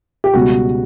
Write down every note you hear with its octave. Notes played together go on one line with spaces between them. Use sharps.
G4
C#2 B2 G3 F#4